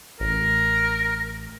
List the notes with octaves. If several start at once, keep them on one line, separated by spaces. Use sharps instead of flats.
A1 A#4